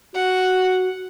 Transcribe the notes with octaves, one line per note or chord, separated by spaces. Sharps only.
F#4 F#5